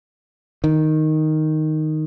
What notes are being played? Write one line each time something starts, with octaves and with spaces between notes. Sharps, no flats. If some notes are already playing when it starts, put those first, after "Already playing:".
D#3